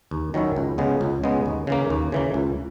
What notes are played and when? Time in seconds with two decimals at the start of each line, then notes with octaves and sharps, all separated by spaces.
0.11 D#2
0.34 D#3 F#3 C#4 E4
0.56 C#2
0.78 C#3 G#3 B3
1.01 C#2
1.23 C#3 G#3 B3
1.46 D#2
1.67 C#3 E3 A#3
1.90 D#2
2.12 C#3 E3 A#3
2.34 C#2